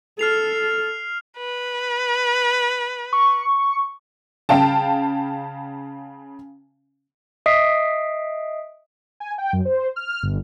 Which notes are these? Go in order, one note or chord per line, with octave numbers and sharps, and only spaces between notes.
A4 F6 C7 F7
B4
C#6
C#3 F5 G5 A5
D#5 E5 D#6 B6 C7 D7
G#5
G5
F#2
C5
F6
G1